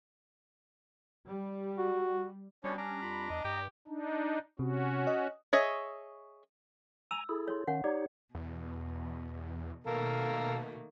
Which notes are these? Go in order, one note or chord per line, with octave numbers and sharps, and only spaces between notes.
G3
F#4
B2 G3 C#4 D4 C#5
C#4 D4 A#5
F2 F4 B5
E2 D#5
G2 G4
D4 D#4
C3 C#4 F#4
D#5
G#4 C#5 D#5 E5
G#5 A#5 E6
E4 G#4 A4
C#5 C6
D#3 C#4 C#5 F5 F#5
D#4 G4 C#5 D5
E2 B2
B2 D#3 A3 A#3 A4 A#4 F5